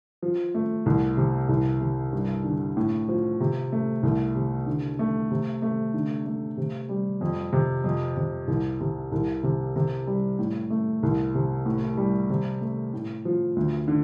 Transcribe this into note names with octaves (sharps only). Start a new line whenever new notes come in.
F3
A3
C2
C3
C2
C3
G2
D3
A2
F3
C3
A3
C2
C3
D3
A3
C3
A3
D3
A3
C3
G3
F2
C3
F2
C3
C2
C3
C2
C3
C3
G3
A2
A3
C2
C3
A2
G3
C3
A3
A2
F3
D2
D3